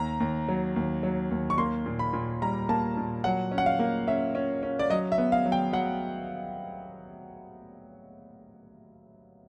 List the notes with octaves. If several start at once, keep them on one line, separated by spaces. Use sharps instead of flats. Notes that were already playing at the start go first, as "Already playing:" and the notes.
Already playing: D#2 A#5
D#2
F#3
D#2
F#3
D#2
C#6
A#3 C6
A#2
B5
A#2
G3 A#5
A#3 A5
A#2
F#3 F#5
C#4
F#5
F5
A#3
C#4 E5
C#4
C#4
D5
F#3 D#5
E5
B3
F5
F#3
G5
F#3 F#5